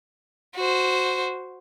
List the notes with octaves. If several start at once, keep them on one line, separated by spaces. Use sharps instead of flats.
F#4 C5